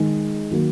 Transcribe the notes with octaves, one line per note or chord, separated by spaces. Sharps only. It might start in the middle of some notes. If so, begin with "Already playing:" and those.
Already playing: D#3 G#3 D#4 G#4
D#3 F#3 A#3